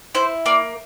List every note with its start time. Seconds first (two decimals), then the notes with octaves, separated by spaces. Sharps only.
0.15 E4 C5
0.46 A#3 D5